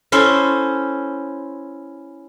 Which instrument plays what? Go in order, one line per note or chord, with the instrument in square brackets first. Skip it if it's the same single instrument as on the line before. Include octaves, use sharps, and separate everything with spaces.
[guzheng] C#4 E4 A4 C5